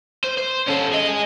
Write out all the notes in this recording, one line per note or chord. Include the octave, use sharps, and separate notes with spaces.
C5
C5
C#4 A4
G#4 D#5